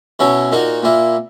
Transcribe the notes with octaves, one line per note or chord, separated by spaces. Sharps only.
B2 F#3 C#4 E4
A#2 A#3 D#4 F#4
A#2 A#3 E4